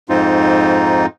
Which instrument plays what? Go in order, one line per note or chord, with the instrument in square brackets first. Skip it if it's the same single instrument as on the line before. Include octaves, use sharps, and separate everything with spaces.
[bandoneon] F2 G#2 C4 D#4 F4